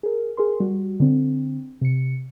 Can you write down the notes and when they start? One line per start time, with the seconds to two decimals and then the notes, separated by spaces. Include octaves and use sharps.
0.03 G#4 A#4
0.37 G#4 A#4 C6
0.60 G3 F#4
1.00 D3 C4
1.81 C3 C#7